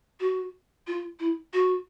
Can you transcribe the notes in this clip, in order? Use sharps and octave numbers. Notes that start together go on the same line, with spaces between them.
F#4
F4
E4
F#4